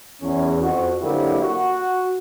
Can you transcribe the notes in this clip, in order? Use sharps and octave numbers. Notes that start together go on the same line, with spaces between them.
E2 C#4
F2 F#4
D3 F#3 A#3 C4 E4 G4
F#4